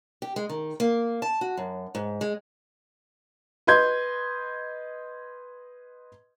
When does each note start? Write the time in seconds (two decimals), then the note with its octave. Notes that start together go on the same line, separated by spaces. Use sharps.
0.22 G4
0.36 G#3
0.50 D#3
0.80 A#3
1.22 A5
1.41 F#4
1.57 F#2
1.95 G#2
2.21 G#3
3.67 B4 D#5 C6 G6 G#6